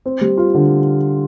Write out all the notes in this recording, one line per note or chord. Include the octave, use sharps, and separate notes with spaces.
C4
G3
F4
D3